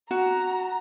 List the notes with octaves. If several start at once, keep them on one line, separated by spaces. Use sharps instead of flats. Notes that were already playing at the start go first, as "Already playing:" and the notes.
F#4 A#5